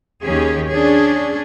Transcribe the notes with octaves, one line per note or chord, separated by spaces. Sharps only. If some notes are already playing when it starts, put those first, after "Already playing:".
D#2 D#3 C#4 G4 G#4
C#4 D4 G#4